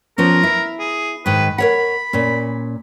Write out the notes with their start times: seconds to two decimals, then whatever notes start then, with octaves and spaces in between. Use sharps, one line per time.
0.18 F3 B3 C#4 A#4
0.43 E4
0.79 G#4
1.26 G#2 D#3 B4
1.58 A#4 C#5 F#5 B5
2.13 A#2 C#4